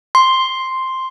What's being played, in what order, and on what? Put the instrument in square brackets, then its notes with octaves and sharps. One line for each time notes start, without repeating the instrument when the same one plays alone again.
[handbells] C6